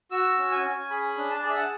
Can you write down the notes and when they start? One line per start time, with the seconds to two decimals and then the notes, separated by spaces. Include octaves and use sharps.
0.11 F#4 E6
0.38 C#4
0.51 G#5
0.64 C#4
0.90 G#4 B5
1.17 D4
1.31 A5
1.42 G#4 D5
1.50 E5
1.57 F#5